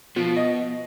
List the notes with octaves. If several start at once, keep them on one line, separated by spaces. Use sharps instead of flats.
B2 F3
D#5